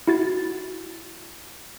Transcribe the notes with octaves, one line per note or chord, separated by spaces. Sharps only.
E4 F#4 A6